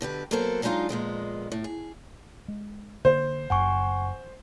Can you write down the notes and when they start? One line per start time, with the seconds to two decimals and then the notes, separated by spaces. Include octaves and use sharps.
0.01 B2 D3 G4 B4
0.31 F#3 A#3 B3 A4 A#4 C5
0.62 F#3 G#3 D4 D#4 F4 F5
0.89 F2 A#2 G#3 B3
1.52 A2
1.64 G#4
2.48 G#3
3.05 D3 A#3 C5
3.50 F#1 F#2 F#5 G#5 C#6